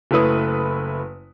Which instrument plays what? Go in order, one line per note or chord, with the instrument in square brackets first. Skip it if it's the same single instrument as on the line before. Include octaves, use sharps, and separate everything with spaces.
[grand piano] F#1 A3 E4 B4 D#6